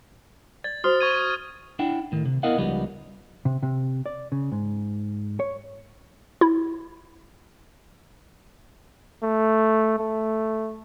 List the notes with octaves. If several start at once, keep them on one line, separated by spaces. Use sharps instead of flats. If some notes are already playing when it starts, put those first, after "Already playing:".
D5 A6
F#4 C5 D#6 F6
C#6 G#6 D#7
D4 E4 F#5 G5
A2 D#3
C3
B3 E4 A#4 D#5 F5 F#5
C#2 F3 G3 B3 D#4 F#4
C3
C3
D5
C#3
G#2
C#5
E4
A3
A3